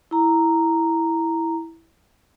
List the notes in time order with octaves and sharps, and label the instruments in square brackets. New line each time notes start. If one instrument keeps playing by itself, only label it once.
[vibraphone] E4 A#5